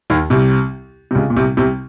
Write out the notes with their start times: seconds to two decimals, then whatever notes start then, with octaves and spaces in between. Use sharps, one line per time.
0.10 D#2 D#3
0.30 C2 C3
1.11 C3
1.15 C#2 C#3
1.30 A#2
1.36 C2 C3
1.57 C2 C3